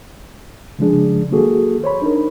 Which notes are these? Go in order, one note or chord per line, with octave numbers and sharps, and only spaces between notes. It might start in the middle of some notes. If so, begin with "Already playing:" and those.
C#3 F3 G#3 D4 G#4
D#3 F#3 A#3 F#4 G#4 A4
C5 C#5 B5
D4 D#4 A#4